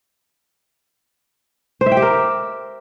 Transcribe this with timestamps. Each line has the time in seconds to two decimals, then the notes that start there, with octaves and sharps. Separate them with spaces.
1.81 C5
1.86 E5
1.92 G5
1.97 G4
2.02 A#4